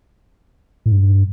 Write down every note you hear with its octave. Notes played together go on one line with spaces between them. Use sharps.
A2
G2